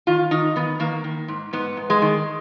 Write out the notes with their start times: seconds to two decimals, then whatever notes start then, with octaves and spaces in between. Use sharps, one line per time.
0.07 D#3 F4
0.31 D#3 D#4
0.56 D#3 B3
0.79 D#3 A#3
1.04 D#3
1.28 G#2
1.53 G#2 B3
1.77 G#2
1.90 G#3
2.02 D#3